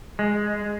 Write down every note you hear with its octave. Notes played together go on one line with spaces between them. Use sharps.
G#3